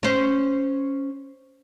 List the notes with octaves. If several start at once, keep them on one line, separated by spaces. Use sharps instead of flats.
C#4 C5